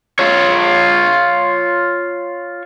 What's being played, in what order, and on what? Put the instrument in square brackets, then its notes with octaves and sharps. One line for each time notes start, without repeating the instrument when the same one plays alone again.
[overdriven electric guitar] F4 C#5